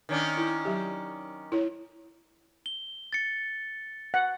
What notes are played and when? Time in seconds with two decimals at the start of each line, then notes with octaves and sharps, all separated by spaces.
0.09 D#3 C#4 D4
0.37 E4
0.65 F#3 G4
1.52 E4 C#5
2.66 G7
3.13 A6 C#7
4.14 F#5